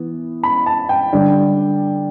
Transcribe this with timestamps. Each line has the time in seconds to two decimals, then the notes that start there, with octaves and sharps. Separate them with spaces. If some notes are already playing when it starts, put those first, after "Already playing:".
Already playing: E3 B3
0.43 B5
0.66 A5
0.89 G5
1.12 D3 G3 D4